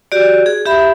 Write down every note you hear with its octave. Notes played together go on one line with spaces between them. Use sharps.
F#4 G4 D5
G#4
G4 E5 B5